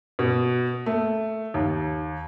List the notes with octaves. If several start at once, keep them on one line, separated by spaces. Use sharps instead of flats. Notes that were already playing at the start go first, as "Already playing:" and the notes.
B2
A3
D#2